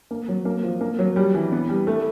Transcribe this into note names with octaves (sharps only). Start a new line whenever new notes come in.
A#3
F#3
A#3
F3
A#3
F#3
G3
E3
B3
G3
A3